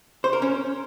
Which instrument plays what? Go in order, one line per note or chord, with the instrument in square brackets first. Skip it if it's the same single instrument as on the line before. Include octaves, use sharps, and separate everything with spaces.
[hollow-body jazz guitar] C5
A#4
C#4